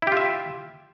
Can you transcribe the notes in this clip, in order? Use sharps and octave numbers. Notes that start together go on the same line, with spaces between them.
E4 F4 G4 E5